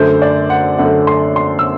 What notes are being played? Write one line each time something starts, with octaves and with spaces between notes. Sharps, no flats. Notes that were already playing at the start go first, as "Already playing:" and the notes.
Already playing: F#2 D3 A3 C5
D5
F#5
F#2 D3 A3 F#5
C6
C6
E6